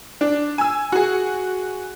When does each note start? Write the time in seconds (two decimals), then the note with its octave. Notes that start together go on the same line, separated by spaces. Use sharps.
0.21 D4
0.58 G#5 E6
0.92 F#4 G#4